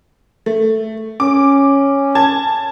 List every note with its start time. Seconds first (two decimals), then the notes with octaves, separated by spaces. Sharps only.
0.46 A3
1.20 C#4 D6
2.15 A5 G#6